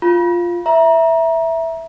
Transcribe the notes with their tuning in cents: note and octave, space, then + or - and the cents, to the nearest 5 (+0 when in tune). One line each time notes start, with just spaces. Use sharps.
F4 +0 B5 -35
E5 +0 A#5 +25